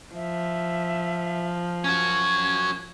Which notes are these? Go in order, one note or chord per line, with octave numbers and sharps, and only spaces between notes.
F3 E5
C#4 F#4 G#6